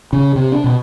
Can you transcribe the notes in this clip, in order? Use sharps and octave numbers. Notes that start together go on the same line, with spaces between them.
C#3
C3
D4
B2